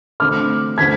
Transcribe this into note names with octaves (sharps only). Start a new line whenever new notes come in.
D3 A3 C4 D6 F6
D3 A3 C4 G#6 B6